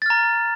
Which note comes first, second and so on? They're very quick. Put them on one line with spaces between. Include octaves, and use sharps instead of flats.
A6 F6 A#5